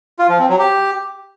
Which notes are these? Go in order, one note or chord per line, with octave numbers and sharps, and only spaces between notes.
F4
F3
C4
F#3
G4